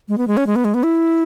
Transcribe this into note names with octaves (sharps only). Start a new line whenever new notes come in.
G#3
B3
G#3
C#4
G#3
B3
G#3
B3
E4